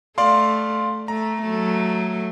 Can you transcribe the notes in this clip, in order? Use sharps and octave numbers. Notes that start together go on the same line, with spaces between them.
A3 D5 F5 C6
A3 A#5
F#3 A3